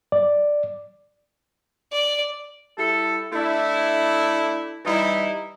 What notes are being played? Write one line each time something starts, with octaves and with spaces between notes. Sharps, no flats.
D5
D5
G3 E4 A4
A3 D4 E4
E3 G3 D#4 E4